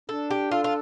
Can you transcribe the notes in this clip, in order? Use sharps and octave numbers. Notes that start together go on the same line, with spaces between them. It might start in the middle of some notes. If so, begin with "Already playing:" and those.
D4 A4
G4
F4 A4
F4